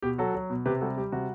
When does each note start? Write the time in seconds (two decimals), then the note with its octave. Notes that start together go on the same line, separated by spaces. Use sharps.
0.02 B2 G4
0.18 F#3 F#4 A4
0.34 F#3
0.50 B2
0.66 C3 G4 B4
0.81 G3 F#4 A4
0.97 G3 G4
1.12 C3 F#4